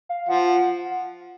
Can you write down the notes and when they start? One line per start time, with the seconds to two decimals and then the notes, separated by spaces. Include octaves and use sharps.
0.09 F5
0.29 F3 F#5